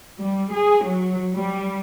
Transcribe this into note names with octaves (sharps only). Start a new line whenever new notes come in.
G3
G#4
F#3
G3